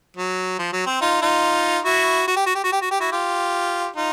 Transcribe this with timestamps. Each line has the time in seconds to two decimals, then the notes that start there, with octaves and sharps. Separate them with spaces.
0.17 F#3
0.59 F3
0.73 F#3
0.87 C4
1.01 D#4 F4
1.22 D#4 F4
1.85 E4 F#4
2.28 F#4
2.36 G4
2.46 F#4
2.55 G4
2.64 F#4
2.72 G4
2.82 F#4
2.91 G4
3.00 E4 F#4
3.12 F4 G4
3.96 D#4 F4